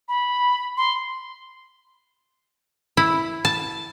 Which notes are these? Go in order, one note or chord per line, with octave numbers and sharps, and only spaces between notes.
B5
C6
E4
A5